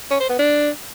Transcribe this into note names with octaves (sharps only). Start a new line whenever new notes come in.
C#4
C5
B3
D4